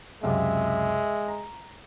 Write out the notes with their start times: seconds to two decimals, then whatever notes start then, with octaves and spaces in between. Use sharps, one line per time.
0.23 C#2 F#2 C3 G#3 E5
1.28 A#5